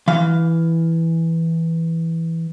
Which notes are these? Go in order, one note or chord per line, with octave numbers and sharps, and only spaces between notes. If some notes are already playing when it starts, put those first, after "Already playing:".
E3 F5